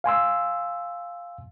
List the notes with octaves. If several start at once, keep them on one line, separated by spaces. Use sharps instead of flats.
F5 G#5 C6 E6